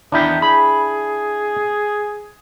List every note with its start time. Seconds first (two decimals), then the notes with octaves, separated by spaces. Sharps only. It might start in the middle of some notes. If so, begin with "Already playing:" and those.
0.12 E2 D#3 B3 D4 E4 G4
0.42 G#4 B5